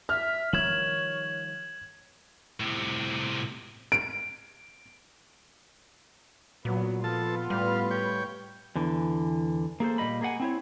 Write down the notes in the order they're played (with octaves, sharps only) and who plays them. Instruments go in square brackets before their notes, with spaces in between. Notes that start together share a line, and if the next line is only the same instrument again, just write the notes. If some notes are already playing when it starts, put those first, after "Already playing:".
[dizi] E5 [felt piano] F6
[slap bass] D#3 F3 G3 [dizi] C#5 [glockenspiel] G#6 E7 F#7
[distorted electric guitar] A2 C3
[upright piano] D7
[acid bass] A#2 [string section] F#3 B3
[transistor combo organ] F3 A4 A5 [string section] B3 F4
[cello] A2 B4 [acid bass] G3 [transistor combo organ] F5
[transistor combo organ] C#5 G5
[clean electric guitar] E2 D3 E3
A#3 G#4 A4 C5
A#2 D#3 G3 D#5 B5
A#3 G#4 A4 F#5 G#5
C4 E4 C#5